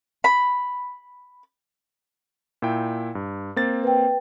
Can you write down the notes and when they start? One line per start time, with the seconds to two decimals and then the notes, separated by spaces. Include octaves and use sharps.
0.24 B5
2.62 A#2 E4 G5
3.15 G2
3.56 A#3 C4 A6
3.84 B4 G5